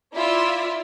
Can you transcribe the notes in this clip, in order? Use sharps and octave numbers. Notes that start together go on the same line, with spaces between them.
E4 F4 D5 E5